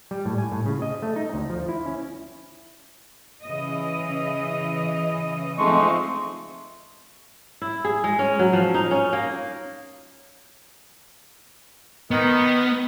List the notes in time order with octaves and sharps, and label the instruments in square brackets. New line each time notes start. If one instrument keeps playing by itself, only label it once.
[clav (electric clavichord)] G3
A2
G#5
A2
C#3
D#5
A3
D#4
D2
F3
E4
C#4
[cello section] C#3 E3 D#5
[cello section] F3 C4 D#4 [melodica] G#3 A3 C#6
[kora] E4
G#4
G#3
C#4
F#3
F3
D#4
C#4
A#3
[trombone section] D#3 [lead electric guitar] B3